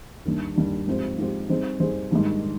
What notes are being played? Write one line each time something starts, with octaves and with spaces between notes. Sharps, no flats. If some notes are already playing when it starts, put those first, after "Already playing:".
D#2 D#3 G3 D4
D#2 D#3 G3 D4
G#2 F3 C4 G4 C5
G#2 F3 C4 G4 C5
G3 C4 D#4 G#4 C5
G3 C4 D#4 G#4 C5
G#2 D#3 G3 D4
D#3